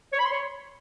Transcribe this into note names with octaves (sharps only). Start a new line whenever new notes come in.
C#5
B5
C6
C#5